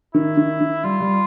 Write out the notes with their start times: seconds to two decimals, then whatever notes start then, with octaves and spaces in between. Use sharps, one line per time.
0.15 D#3 E4
0.37 D#3
0.61 D#3
0.84 G3 F4
1.01 G3